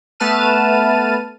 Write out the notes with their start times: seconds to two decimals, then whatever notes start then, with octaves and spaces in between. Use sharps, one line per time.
0.20 A3 B3 B4 A5 F6 D#7